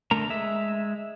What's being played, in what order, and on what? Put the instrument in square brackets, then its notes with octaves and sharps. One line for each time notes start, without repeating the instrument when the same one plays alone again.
[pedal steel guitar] D3 A3 A#4 A#5
G#3 E5